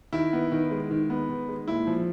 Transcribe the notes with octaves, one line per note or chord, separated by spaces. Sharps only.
D#3 E4
B3
D#3
G#3
D#3
B3
D#3
G#3
A#2 E4
F3